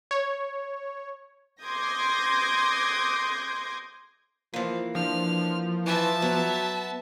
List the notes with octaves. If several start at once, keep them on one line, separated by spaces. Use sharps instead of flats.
C#5
C6 D6 D#6 G6 G#6 A#6
E3 F3 A#3
F3 D4 F6
E3 E5 A5
F#3 B3